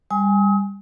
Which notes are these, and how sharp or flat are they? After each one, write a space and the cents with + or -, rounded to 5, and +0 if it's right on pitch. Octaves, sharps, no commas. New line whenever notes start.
G3 +25 G#5 +0 D#6 +40